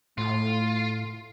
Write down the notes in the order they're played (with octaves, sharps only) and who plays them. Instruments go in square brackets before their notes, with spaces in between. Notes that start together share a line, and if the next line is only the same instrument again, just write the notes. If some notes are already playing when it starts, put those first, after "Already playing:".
[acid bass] A2 [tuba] A3 [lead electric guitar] F4